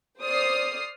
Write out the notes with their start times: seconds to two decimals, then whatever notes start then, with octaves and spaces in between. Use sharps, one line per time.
0.21 C5 D5 D#6 F6 C7